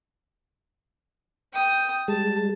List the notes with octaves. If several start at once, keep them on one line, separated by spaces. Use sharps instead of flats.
G5 D#6
G3 G#3 A5